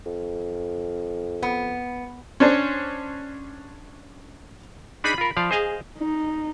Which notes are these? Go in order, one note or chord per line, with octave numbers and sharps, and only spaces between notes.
F2
B3
C#4 D4 C5
D4 D#4 G#4 B5
F4 A#4
F3 D5 F5
G#4 C5 D#5 F5
D#4